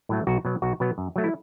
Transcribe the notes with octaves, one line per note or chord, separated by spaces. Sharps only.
A2 F#3 A3
B1 F#4
B2 F#3 B3
B1 F#4
B2 F#3 B3
F#2
F#3 A3
E4